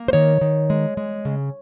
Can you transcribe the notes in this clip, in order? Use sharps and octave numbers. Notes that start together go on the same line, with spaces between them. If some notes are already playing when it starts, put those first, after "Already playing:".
Already playing: A#3
C5
D#3 C#5
D#3
G#3
G#3
C#3